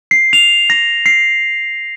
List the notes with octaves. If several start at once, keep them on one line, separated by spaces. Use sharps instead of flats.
C7
F7
A#6
C7